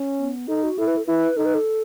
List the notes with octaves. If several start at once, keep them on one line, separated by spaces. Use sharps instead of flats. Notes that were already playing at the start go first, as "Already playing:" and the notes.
Already playing: C#4
B3
D#4 A4
F#4
E4 A4
B4
A4
E4 B4
D#4 A4
B4
A4